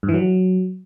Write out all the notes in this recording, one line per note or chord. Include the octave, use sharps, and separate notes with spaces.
G2
E3
F#3